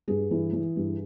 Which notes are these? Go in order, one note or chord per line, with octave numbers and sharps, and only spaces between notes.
G2 G#4
E3
E3
G2